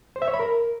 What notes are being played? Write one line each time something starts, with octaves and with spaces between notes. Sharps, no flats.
C5
E5
C#5
B5
A#4